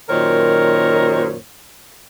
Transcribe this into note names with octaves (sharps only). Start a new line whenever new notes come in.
F#2 A#2 D#3 A#4 C5 C#5